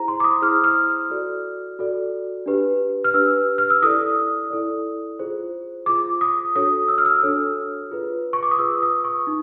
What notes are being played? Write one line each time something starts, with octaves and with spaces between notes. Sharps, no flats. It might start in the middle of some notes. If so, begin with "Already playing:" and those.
Already playing: E4 G#4 C5 A#5
C6
D6
D#6
E4 G#4 C5 F6
F6
F#4 A4 D5
F#4 A4 D5
D4 G4 B4
F6
D4 G4 B4 E6
F6
E6
E4 A4 D5 D#6
E4 A4 D5
F4 G#4 C5
F4 G#4 C5 D6
D#6
D4 F#4 A4 C#5 D#6
E6
F6
E6
D4 F#4 A4 C#5
F4 G#4 B4
C#6
D6
D#6
F4 G#4 B4 E6
D#6
C#6
D#4